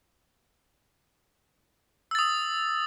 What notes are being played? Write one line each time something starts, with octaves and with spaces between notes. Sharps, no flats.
D#6 E6 A6